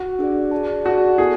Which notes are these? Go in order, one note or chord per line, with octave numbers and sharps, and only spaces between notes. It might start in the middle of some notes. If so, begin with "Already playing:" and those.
Already playing: F#4
D4 G#4 D5
G#4 D5 A5
F#4 G#4 D5 A5
B3 E4 G#4 A4